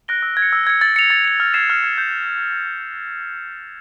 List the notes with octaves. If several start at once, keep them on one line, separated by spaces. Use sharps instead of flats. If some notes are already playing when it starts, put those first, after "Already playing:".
F#6 A#6 D7 G7
E6
G#6
C#7
E6
G#6 C#7
A6
C#7 F7
A6
C#7 F7
F6
G#6 C7 E7
F6
G#6 C7 E7
G6